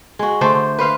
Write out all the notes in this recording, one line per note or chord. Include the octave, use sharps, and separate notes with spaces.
G#3 F#4
D3 A3 C5
B4 C5 F5